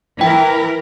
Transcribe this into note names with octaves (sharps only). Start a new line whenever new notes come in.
E3 E4 A#4 G5